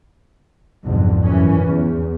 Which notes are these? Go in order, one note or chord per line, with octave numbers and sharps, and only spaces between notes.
B1 F2 G#2 D3
F#2 E3 C#4
E2